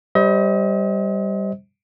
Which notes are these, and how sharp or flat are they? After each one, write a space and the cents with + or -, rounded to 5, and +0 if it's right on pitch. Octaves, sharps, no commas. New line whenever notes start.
G3 +0 C5 +0 D#5 +40